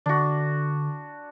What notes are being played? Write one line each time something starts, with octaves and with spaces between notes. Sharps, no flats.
D3 D4 F#4